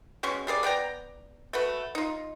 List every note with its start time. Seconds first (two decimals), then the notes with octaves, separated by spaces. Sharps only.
0.23 B2 G#3 C#4 C#6
0.47 G3 G#4 A#4 D5
0.63 B3 D5 G5 A#5
1.53 A3 F#4 B4
1.95 D#4 F4